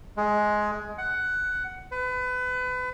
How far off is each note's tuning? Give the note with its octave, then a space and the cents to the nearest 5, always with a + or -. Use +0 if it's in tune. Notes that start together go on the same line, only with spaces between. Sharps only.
G#3 +15
F#5 +10
B4 +30